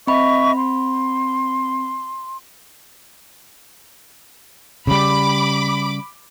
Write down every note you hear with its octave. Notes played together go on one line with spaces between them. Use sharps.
C4 D#5 E5 B5 C#6
C6
C#3 G3 B5 D6